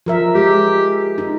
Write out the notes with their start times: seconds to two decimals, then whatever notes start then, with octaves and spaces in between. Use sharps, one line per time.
0.06 F3 A#4 E5
0.35 G#3 G4
1.18 D#4